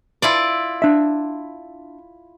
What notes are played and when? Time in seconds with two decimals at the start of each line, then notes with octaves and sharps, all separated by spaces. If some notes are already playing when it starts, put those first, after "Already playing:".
0.22 E4 F4 D5
0.82 D4 E5